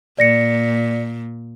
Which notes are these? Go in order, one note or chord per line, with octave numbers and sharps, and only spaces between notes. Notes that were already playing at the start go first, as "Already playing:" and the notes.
A#2 D5 A#6 C#7